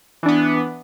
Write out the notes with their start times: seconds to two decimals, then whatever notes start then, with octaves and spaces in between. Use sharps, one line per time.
0.23 E3
0.26 D4
0.29 B3